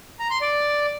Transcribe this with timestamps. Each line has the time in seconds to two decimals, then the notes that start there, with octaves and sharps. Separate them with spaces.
0.19 A#5
0.30 C6
0.42 D5